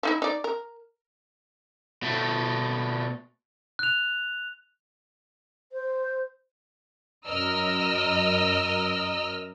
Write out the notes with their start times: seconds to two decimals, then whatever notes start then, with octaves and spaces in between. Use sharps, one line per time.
0.03 F3 D#4 E4
0.22 D#4 D5
0.44 A#4
2.02 B2 A3
3.79 F#6 F7
5.72 C5
7.26 F#2 A#4 D#5 E6 F6